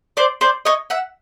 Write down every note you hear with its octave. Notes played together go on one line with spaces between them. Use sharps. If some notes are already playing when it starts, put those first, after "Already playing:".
C5 D5
C5 D5
C#5 D#5
E5 F#5